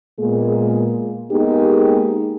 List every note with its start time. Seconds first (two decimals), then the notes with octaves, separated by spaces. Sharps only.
0.19 A#2 G#3 A#3 B3 G#4
1.31 G#3 A#3 B3 D#4 G4 G#4